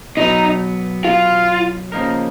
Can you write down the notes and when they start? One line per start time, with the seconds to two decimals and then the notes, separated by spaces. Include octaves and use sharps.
0.17 B2 F#3 B3 D#4
1.05 F4
1.92 C#3 F3 A#3 D#4 A#4